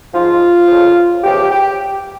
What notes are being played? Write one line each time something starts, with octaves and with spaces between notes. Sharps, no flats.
G#2 F3 F4
F2 C#3 F3
E2 C#3 F3 G4
G4